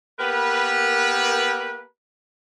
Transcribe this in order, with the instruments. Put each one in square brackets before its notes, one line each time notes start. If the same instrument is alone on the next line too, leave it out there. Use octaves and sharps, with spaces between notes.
[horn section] A#3 B3 G4 A#4 B4